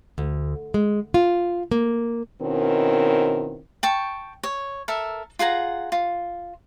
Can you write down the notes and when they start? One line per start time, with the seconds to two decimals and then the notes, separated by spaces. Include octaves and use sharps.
0.18 D2
0.74 G#3
1.14 F4
1.71 A#3
2.42 B2 D#3 C4 C#4 E4 A#4
3.83 G5 A5 C#6
4.43 C#5
4.88 A4 A#4 E5
5.39 F4 G#4 F#5 A#5
5.92 F4